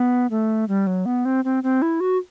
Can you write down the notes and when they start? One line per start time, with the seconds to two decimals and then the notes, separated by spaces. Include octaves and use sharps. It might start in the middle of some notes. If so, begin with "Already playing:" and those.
Already playing: B3
0.31 A3
0.68 G3
0.87 F#3
1.06 B3
1.25 C4
1.45 C4
1.63 C4
1.82 E4
2.00 F#4